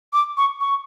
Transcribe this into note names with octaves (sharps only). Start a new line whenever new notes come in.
D6
C#6
C#6